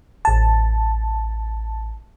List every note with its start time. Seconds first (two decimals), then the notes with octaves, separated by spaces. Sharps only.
0.25 A1 A5